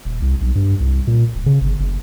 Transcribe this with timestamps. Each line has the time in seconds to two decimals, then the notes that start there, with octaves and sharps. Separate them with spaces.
0.05 D#1
0.22 C2
0.41 B1
0.55 G2
0.80 C2
1.07 A#2
1.35 D1
1.46 C#3
1.61 G1
1.80 F#1